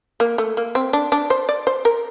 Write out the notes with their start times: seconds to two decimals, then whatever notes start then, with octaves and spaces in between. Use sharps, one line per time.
0.20 A#3
0.38 A3
0.57 A#3
0.75 C4
0.93 D4
1.12 D4
1.30 C5
1.49 D5
1.67 C5
1.85 A#4